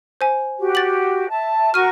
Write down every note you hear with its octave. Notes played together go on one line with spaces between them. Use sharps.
C5 G#5
F#4 G4
A6 F#7
E5 A5
F#4 A#4 C#6 F6 D#7